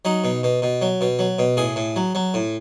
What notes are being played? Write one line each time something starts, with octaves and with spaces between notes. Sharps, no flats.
F#3 D#4
B2
B2
B2
F#3
B2
F#3
B2
A2 G#4
A2
F#3
F#3
A2